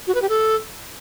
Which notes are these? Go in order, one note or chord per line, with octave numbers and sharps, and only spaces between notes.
F#4
B4
G4
A4